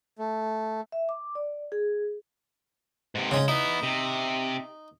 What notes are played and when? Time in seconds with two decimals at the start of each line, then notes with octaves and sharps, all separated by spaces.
0.19 A3
0.92 E5
1.09 D6
1.35 D5
1.72 G#4
3.15 G#2 C3
3.31 C#3 G#3
3.48 B3 D#4 E4
3.83 C3